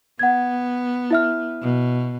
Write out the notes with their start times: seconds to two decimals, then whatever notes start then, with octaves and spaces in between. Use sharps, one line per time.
0.19 B3 F#5 G#6
1.11 E4 E5 F6
1.62 B2